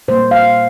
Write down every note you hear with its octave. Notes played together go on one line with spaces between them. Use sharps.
A#2 G3 A#3 C5
F5